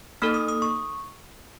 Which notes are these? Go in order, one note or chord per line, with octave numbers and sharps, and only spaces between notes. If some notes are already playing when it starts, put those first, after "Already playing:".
A#3 D#4 A4 F6
D#6
D#6
C#6